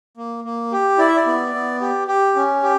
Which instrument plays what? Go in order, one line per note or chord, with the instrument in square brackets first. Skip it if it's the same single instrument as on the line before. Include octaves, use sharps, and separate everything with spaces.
[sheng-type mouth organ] A#3
A#3
G4
E4 D5
E5
D5
B3
B3
G4
G4
C#4
G4